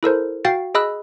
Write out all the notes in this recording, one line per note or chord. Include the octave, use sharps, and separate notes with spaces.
E4 A4 A#4 C5
F#4 F5 G5 A6 C7
G#4 D#5 B5 E6 F#6